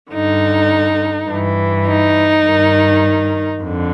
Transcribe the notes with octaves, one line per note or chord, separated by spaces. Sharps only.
G2 D3 D#4
G2 E3
D#4
G2 D#3
F2 D3